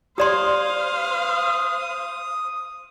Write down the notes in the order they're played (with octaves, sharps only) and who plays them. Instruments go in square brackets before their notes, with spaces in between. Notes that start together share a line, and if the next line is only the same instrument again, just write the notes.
[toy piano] G4 D5 C6 [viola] C5 F5 [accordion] D#6